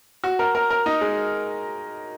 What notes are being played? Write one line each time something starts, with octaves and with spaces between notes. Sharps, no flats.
F#4
A#4
A#4
A#4
D#4
G#3